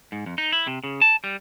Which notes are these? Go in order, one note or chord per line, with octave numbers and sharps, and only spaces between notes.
G#2
F2
D#4
E4
C3
C#3
A5
G3